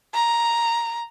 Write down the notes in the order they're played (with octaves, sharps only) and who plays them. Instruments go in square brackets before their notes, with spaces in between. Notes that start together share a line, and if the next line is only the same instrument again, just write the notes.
[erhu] A#5